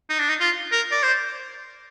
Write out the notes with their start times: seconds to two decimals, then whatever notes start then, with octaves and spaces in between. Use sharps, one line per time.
0.10 D#4
0.19 D4
0.29 D#4
0.40 F4
0.72 A#4
0.92 D5
1.03 C5